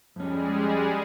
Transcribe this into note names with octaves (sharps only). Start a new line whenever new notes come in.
F2 G3 G#3 C#4 G#4